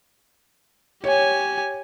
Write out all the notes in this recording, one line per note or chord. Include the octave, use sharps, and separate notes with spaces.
G4 C#5 G#5